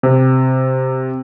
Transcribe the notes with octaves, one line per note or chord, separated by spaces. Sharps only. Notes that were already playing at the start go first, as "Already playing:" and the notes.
C3